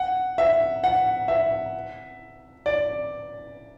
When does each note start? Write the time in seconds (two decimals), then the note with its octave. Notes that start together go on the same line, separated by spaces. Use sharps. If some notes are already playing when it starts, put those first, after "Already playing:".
Already playing: F#5
0.38 E5
0.84 F#5
1.28 E5
2.66 D5